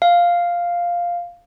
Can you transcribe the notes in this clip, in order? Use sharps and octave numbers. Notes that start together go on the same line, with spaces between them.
F5